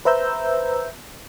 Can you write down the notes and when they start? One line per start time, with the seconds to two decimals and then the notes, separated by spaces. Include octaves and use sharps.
0.05 B4 C5 E5 A#5 E6 G6